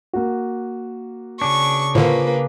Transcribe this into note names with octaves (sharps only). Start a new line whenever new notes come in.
A#3 F#4
C#3 D4 C#6
A2 D3 A#3 F4 B4 C5 C#6